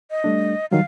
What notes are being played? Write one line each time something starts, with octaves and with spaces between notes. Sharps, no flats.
D#5
G3 A3 D4
D#3 F#3 G3 F5